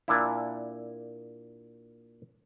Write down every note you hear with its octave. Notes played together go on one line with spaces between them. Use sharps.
A#2 D4 E4